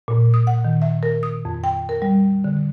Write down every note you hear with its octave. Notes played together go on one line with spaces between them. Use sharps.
A#2
D#6
F#5
D#3
E5
A#4
D#6
F2
G5
A#4
G3
D3